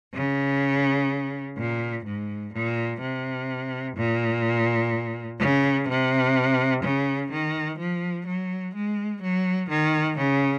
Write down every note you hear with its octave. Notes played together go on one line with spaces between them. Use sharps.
C#3
A#2
G#2
A#2
C3
A#2
C#3
C3
C#3
D#3
F3
F#3
G#3
F#3
D#3
C#3